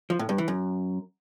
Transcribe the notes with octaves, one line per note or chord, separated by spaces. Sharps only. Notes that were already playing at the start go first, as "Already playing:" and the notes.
F3
A2
G2
E3
F#2